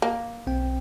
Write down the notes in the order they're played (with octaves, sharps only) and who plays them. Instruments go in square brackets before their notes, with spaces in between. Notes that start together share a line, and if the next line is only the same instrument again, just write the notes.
[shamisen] A#3
[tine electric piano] B1 C4 G5